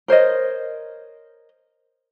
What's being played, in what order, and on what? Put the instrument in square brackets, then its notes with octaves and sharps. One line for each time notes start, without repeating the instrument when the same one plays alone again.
[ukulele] A#4 C5 C#5 D#5